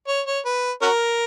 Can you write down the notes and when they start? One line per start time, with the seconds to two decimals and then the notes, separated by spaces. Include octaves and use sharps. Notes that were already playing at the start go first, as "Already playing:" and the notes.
0.08 C#5
0.26 C#5
0.45 B4
0.82 C#4 F#4 A#4